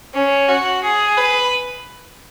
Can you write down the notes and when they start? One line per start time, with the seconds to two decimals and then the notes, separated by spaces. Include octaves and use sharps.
0.14 C#4
0.49 F#4
0.83 G#4
1.17 B4